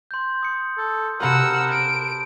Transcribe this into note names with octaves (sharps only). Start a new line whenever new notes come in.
C6 G6
D#6 C#7
A4
C3 C4 F#4 A#4 F#5 A5 B5 E6
D7